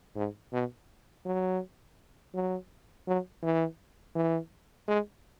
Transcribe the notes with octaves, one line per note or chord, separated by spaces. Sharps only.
G#2
B2
F#3
F#3
F#3
E3
E3
G#3